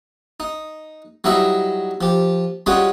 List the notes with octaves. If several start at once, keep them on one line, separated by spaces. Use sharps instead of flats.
D#4
F#3 G3 D#4 E4 D#5 E5
F3 G4
G3 G#3 C#4 F4 F#4 G#4